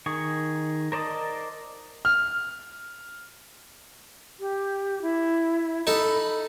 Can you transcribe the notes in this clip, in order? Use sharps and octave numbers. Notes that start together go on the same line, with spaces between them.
D#3 G#4 C#6
A#4 C5 D5 D#5 A5
F6
G4
E4
D#4 A4 B5